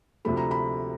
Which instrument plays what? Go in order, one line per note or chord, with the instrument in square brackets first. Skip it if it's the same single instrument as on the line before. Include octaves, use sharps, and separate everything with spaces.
[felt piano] D2 C3 F3 A3 B5
A#5
B5